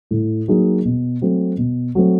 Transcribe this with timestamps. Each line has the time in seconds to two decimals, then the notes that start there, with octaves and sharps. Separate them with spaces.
0.11 A2
0.48 F#3 A#3 D#4 G#4
0.85 B2
1.22 F#3 A3 C4
1.58 B2
1.95 F#3 A3 C4